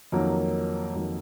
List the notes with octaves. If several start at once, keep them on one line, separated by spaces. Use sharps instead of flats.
F2 D#3 F#3 A#3
F2 D#3 F#3 A#3